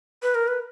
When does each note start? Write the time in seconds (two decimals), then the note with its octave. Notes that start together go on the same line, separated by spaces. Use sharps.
0.23 B4
0.35 A#4
0.48 B4